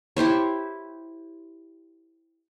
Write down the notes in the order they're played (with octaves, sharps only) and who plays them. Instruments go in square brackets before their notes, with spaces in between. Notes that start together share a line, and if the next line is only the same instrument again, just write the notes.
[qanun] E4 G4 C5 C#5